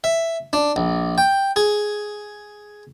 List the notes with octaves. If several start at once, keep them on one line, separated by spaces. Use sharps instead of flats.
E5
D4
A#1
G5
G#4